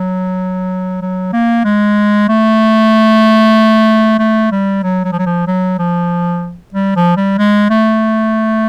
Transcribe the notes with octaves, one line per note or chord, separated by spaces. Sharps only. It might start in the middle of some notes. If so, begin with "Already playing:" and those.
Already playing: F#3
F#3
A#3
G#3
A3
A3
G3
F#3
F#3
F3
F#3
F3
F#3
F3
G3
F3
G3
G#3
A3